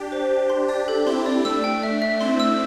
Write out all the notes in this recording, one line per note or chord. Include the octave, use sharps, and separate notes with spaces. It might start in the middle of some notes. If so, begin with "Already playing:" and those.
Already playing: D4 G4
C5
C5
C6
D4 G4 D5
A4
C4 E4 C6
D5
A3 D4 E6
G5
E5
E5
C4 E4 C6
E6